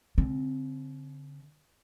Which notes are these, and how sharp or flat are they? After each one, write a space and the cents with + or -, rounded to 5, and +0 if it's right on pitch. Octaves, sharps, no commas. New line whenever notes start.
D3 -45 C4 +5